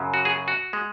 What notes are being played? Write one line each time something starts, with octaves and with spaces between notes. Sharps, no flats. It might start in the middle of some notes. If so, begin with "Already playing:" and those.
Already playing: F#2 C#3 F#3
F#4
G#4
F#4
G#3